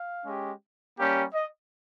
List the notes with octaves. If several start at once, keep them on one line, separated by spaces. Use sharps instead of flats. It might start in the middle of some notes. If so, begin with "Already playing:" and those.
Already playing: F5
G#3 C#4 G4
G3 A#3 C#4 G4
D#5